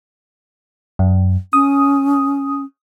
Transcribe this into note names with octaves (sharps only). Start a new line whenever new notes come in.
F#2
C#4 D#6